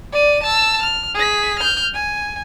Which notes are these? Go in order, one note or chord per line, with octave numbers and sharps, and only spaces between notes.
D5 D#7
A5 E6
F6
G#4 B6
F6 G6
G#5